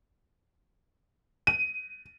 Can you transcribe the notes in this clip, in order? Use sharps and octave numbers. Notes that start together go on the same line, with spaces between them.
D#7